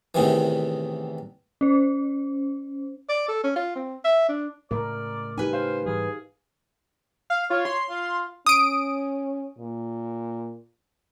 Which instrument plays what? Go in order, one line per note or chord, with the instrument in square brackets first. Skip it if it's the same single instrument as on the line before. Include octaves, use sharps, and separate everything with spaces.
[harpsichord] E2 A2 C3 D#3 E3
[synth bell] C#4 C5
[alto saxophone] D5
A4
C#4
F4
C4
E5
D4
[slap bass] A2 C#3 G#3 [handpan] A#4 [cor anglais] D5
[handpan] D#4 G4 [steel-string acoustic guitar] B4 G#5
[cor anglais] C5 [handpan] F5
[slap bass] G#2 E3 G3 [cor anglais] G#4
[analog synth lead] F5
[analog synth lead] F4 [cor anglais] C#5
[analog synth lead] C6
[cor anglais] F4
[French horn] C#4 [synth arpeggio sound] D#6 D7
[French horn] A#2